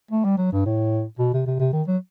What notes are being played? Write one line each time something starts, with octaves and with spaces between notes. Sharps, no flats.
A3
G3
F#3
G2
A2
B2
C3
C3
C3
D#3
F#3